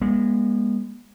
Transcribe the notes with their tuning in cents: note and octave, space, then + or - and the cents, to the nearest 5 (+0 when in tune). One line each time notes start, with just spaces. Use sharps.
G#3 -25 B3 -45